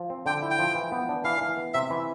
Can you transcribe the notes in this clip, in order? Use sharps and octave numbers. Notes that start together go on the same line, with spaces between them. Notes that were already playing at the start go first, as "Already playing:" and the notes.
Already playing: F3
C4
D3 G5
E4
G5
F3
E3
B3
D4
E3 F5
E3
B3
C3 E5
E3